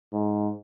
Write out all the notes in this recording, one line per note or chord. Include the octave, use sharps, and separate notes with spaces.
G#2